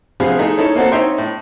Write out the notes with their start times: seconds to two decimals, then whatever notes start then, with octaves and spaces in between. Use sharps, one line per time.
0.20 C3 F3 B3 G#4 F5
0.39 A3 D#4 G#4
0.58 C#4 D#4 E4 A4 C#5
0.75 A#3 C4 F#4 A4
0.92 C4 D#4 C#5 E5 G5 C6
1.18 A2